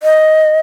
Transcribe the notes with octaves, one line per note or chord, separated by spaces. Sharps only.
D#5